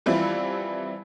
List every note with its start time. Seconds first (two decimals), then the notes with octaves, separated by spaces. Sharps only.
0.06 E3 F3 G3 C4 E4 F4